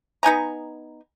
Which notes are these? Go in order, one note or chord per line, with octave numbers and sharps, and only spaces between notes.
B3 D#4 G#5 A#5